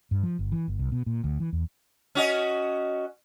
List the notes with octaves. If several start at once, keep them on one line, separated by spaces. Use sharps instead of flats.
G2
F3
G1
E3
G1
C2
B2
A#2
D2
E3
E2
C#4 F#4 D#5